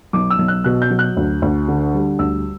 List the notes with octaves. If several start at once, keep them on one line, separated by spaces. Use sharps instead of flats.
B1 D6
E6
B1
F#6
B2 F#6
G6
F#3
F#6
D2
D2
D3
G3
D2 E6